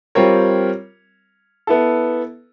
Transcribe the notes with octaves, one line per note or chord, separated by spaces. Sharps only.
G3 C4 F4 A#4 C#5
B3 E4 A4